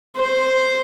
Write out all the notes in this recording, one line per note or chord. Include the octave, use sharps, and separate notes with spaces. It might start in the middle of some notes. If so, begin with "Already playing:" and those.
C5